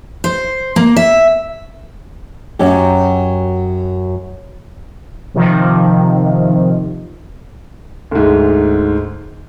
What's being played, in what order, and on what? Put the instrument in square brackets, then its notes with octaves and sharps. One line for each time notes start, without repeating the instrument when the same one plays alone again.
[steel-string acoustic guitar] C5
A#3
E5
[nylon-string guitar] F#2 F#3 C#4 G4
[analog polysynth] C3 D#3 F3
[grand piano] D2 G#2